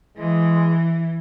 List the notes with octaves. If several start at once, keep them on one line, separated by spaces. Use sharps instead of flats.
E3 G#3